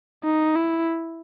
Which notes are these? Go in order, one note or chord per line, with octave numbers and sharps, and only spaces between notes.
D#4
E4